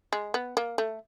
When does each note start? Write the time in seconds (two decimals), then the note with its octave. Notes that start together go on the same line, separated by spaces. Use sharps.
0.13 G#3
0.34 B3
0.57 A#3
0.78 A3